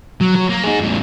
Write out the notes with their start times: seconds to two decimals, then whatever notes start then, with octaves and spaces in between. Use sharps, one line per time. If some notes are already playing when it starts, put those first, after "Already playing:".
0.21 F#3
0.36 F#3
0.50 A#3
0.64 D#4 G#4
0.80 E2 A2